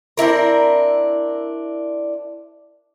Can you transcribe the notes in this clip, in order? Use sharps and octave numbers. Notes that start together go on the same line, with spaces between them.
C4 D4 E4 A#4